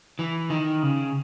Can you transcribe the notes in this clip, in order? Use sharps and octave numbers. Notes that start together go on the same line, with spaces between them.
E3
D#3
C#3